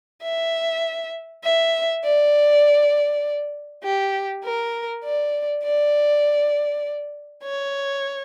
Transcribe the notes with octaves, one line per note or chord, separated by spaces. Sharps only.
E5
E5
D5
G4
A#4
D5
D5
C#5